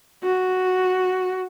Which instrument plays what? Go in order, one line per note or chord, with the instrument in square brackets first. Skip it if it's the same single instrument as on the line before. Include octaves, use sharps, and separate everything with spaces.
[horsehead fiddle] F#4